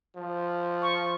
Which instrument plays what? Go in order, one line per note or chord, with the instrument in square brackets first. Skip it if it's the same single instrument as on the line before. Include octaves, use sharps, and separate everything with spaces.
[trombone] F3
[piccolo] C#6